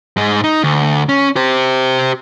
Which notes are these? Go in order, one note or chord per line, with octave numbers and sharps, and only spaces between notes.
G#2 G#3
D#4
D2
C#4
G4 C5